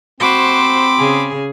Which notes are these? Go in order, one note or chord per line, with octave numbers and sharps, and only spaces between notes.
C4 F#4 C5 B5 D6
C#3 G#4